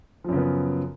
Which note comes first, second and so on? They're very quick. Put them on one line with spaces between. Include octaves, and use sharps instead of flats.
F3 F#2 C#3 B3